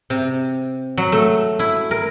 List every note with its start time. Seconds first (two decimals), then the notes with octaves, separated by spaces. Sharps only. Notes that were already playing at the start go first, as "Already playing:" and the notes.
0.10 C3
0.98 F#3
1.12 A3
1.59 E4
1.91 A#4